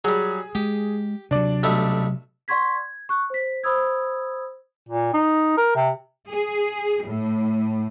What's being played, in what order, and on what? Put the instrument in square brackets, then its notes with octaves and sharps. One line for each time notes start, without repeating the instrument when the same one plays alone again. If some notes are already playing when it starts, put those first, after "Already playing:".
[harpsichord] F#3 G3 [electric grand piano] G#4
[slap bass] G#3 [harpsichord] G4
[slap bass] C3 F#3 [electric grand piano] D4 D5
[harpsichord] B1 G3 A3
[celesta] D5 F#5 C6 C#6 G#6 B6
G#6
C#6 F#6
C5 B6
C5 B5 D#6 E6 G#6
[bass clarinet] A#2
D#4
A#4
C3
[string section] G#4
A2